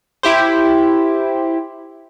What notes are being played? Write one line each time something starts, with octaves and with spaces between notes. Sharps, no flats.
E4 G4 C5